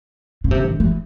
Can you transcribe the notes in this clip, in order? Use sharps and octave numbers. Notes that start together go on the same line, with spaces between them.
C#3
C3
D#3
E3